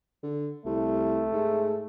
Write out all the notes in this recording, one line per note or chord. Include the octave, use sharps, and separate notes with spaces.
D3
C2 A3
G#2